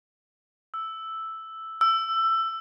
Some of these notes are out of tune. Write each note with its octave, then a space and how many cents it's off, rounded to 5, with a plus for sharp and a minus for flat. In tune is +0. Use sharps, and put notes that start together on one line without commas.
E6 +0
E6 +15